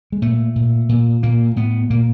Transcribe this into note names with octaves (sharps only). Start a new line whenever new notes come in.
G#3
A#2 A3
A#2
A#2
A#2 A#3
A2 B3
A#2 A#3